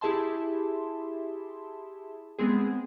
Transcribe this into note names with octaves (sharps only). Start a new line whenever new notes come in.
E4 G4 G#4 E5 A5 C6
G#3 B3 C4 G#4